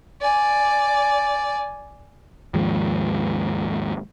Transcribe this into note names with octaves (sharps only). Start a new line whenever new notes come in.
D5 G#5
D#2 G#2 F3